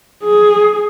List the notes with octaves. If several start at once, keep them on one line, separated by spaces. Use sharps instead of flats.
G#4